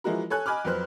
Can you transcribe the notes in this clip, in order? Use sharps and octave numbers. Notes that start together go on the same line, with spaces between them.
E3 F3 G#3 E4 F#4 A#4
A4 C#5 G#5 F#6
D#5 G#5 B5 D6 F6
F2 F#3 B4 C5 F#6